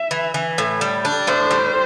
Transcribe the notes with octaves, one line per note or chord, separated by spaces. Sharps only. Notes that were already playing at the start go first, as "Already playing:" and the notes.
Already playing: E5
E3
E3
A2
G3
D4
A2 C5
G3